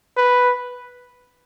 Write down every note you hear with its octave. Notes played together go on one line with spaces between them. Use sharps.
B4